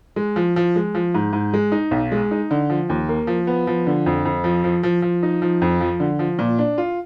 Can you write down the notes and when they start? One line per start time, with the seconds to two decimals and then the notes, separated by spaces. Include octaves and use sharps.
0.16 G#3
0.36 F3
0.56 F3
0.76 G#3
0.95 F3
1.15 G#2
1.33 G#2
1.54 G#3
1.72 D#4
1.91 B1
2.12 G#3
2.31 D#4
2.51 D3
2.70 F3
2.90 D#2
3.09 A#3
3.27 F3
3.47 B3
3.67 F3
3.87 D3
4.06 F2
4.25 F2
4.44 F3
4.64 F3
4.83 F3
5.02 F3
5.23 D#4
5.42 F3
5.62 F2
5.81 F3
6.00 D3
6.19 F3
6.39 A#2
6.59 D4
6.78 F4